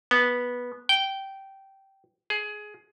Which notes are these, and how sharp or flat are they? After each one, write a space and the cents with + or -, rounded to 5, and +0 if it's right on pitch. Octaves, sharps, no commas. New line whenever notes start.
B3 -10
G5 -15
G#4 +15